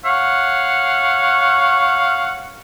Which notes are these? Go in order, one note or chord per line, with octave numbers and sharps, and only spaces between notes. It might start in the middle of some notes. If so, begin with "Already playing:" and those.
C#5 F5 F#5